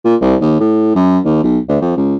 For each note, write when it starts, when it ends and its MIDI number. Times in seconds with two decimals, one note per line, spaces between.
0.04 0.15 46
0.21 0.35 36
0.41 0.55 39
0.60 0.95 45
0.95 1.19 42
1.25 1.41 39
1.43 1.59 35
1.68 1.76 38
1.81 1.93 41
1.97 2.16 37